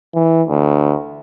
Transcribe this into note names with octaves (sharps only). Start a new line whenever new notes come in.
E3
D2